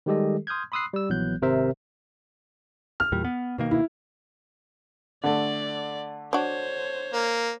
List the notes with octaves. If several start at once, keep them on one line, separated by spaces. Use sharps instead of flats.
D#3 G3 G#3 G4 A4 D#5
C6 D#6 F6 G6 G#6
B5 C6 D#6 E6 F#6 C7
G3 E6
A#1 E3 F#3 B3 F#6 G6
G#1 C3 A#4 C5 E5
F6
E2 A#2 G3
B3
B2 D#3 A#3
E4
D3 A3 D5
D4 F#4 C5 C#5
A#3